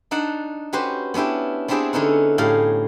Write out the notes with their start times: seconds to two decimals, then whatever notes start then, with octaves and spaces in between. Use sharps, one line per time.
0.11 D4 D#4 F#5 A5
0.73 C#4 F#4 G4 B4 C5
1.14 B3 C#4 D4 E4 G4
1.68 B3 C4 D4 E4 G4 G#4
1.93 D3 C#4 D#4 E4 F#5
2.38 A2 G4 G#4 F5 B5